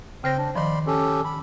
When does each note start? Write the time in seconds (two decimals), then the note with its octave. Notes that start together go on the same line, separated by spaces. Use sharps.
0.24 C#3 C4 C5 G5 A#6
0.38 D4
0.55 D#3 F3 D5 B5 C6
0.87 C#4 G4 A4
1.25 B5